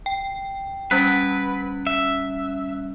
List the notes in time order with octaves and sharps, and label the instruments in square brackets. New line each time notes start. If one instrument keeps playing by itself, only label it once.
[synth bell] G5
[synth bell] G3 C#4 F#6 [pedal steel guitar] B4
[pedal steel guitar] E5